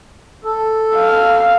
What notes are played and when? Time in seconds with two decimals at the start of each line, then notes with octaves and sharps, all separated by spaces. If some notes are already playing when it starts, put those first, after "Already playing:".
0.44 A4
0.96 F5